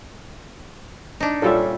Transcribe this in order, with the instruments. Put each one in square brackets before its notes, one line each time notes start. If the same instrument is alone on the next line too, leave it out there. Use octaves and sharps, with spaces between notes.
[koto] D4 D#4
[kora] A#2 G3 E5 [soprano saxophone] C#4 [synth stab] F4 A4